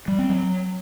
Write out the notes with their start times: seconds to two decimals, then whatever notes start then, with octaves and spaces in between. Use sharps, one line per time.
0.08 G3
0.19 C4
0.29 F#3